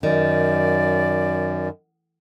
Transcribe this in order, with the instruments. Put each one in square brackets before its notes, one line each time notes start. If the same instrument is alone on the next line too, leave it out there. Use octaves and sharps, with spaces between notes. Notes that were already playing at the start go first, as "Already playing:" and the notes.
[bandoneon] F#2 [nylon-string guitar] D#3 [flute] D5